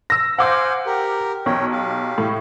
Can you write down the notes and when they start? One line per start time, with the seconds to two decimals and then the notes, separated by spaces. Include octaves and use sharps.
0.10 E6 A#6
0.39 C5 F5 F#5 G#5 D6 G6
0.86 G4 A#4
1.46 B1 C#5 G5
1.72 G4 F5
2.18 A2